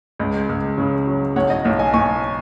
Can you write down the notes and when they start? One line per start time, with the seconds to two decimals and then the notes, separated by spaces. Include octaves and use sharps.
0.19 C#2 D#5
0.49 C#2
0.78 C#3
1.07 F#3
1.36 B1 C#5 F#5
1.50 D#5
1.64 B1 C#5
1.79 D#5 G#5
1.94 B1 G#5 C#6